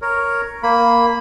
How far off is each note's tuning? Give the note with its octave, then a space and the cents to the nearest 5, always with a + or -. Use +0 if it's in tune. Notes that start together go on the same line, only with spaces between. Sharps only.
A#4 +0 C#5 +0
A#3 +0 B5 +0